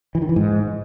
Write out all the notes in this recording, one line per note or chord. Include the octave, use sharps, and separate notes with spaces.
E3
D#3
E3
G#2